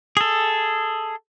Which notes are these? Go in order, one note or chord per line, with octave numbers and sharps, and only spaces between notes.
G#4 A4